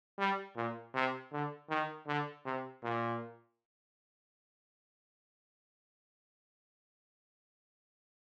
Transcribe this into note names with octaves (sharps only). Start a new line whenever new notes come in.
G3
A#2
C3
D3
D#3
D3
C3
A#2